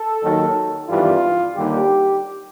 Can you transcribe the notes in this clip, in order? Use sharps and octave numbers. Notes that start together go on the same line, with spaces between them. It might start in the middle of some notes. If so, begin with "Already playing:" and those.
Already playing: A4
D#2 D#3 F#3
G#1 G2 E3 G3 F4
D#2 D3 G3 G4